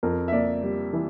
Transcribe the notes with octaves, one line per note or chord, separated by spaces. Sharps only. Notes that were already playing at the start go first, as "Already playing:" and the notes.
F2 A#4
E5
A#3 D5
G3
E3